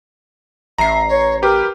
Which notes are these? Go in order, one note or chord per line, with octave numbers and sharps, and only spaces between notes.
A1 E5 A#5 C7
C#5
G4 A#4 B4